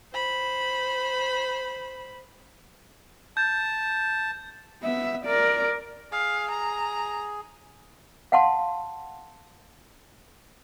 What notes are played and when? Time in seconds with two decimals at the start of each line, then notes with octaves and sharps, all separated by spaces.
0.12 C5 B5
3.37 A5 G6
4.82 B3 E5
5.25 A#4 D5
6.12 G#4 F5
6.50 A#5
8.32 F5 F#5 A5 C6